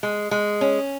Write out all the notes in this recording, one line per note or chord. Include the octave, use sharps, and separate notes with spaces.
G#3
G#3
C#4